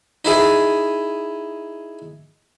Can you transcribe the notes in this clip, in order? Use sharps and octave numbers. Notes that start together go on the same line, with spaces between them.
D#4 E4 G#4